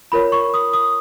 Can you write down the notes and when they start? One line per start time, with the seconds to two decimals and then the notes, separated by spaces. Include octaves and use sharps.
0.12 F4 A#4 C#5 B5
0.32 C#6
0.54 D#6
0.73 D#6